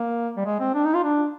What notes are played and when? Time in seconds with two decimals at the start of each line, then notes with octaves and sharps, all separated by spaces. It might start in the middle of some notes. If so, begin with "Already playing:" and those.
Already playing: A#3
0.37 G3
0.45 G#3
0.60 C4
0.74 D4
0.84 D#4
0.94 F4
1.04 D4